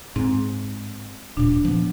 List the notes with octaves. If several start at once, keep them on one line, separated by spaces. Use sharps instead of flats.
G#2 C4
D#1 A#2 D4
F3 B3